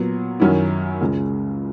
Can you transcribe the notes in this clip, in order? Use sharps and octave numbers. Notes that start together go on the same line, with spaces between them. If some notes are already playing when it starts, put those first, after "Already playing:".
Already playing: A#2 F#3 B3
F#2 D#3 F#3 C#4 E4
C#2 C#3 G#3